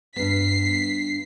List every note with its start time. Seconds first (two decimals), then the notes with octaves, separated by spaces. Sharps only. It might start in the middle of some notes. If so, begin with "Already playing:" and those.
0.16 G2 B3 B6 C7